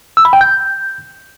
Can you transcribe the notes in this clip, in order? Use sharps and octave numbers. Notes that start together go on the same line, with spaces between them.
E6
B5
G5
G6